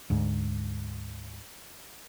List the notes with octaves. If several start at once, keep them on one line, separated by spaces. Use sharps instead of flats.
D2 G#2